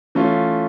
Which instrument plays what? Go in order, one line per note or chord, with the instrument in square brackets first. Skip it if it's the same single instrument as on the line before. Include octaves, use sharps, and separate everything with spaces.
[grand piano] E3 A3 C#4 F4